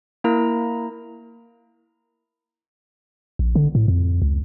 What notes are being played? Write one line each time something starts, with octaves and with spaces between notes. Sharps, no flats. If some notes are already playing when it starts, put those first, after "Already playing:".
A#3 E4 A#4 A#5
A#1
D3
A2
F2
C#2